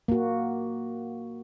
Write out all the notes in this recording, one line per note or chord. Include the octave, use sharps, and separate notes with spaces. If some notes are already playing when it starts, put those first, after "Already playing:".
A#3 F#4